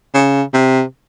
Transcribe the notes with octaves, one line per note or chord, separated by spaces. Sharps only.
C#3
C3